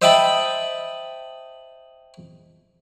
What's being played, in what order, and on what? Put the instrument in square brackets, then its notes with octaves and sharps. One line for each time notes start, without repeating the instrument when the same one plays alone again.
[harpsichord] C5 D#5 E5 G5 A5 B5